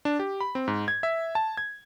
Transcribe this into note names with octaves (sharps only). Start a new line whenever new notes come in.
D4
G4
B5
C4
G#2
G#6
E5
A5
G#6